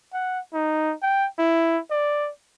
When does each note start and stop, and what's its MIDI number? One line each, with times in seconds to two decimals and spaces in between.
0.13 0.39 78
0.53 0.94 63
1.02 1.27 79
1.38 1.79 64
1.91 2.30 74